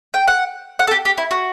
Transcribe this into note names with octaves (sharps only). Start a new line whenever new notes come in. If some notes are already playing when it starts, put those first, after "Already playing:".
G5
F#5
F#5
A4
G4
G4
E4
F#4